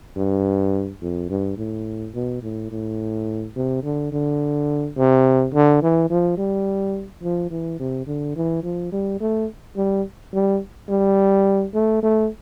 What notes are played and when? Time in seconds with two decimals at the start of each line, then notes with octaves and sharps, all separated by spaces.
0.17 G2
1.02 F2
1.30 G2
1.58 A2
2.14 B2
2.43 A2
2.72 A2
3.56 C3
3.84 D3
4.13 D3
4.97 C3
5.54 D3
5.82 E3
6.10 F3
6.37 G3
7.23 F3
7.51 E3
7.80 C3
8.07 D3
8.36 E3
8.63 F3
8.92 G3
9.21 A3
9.77 G3
10.34 G3
10.89 G3
11.74 A3
12.03 A3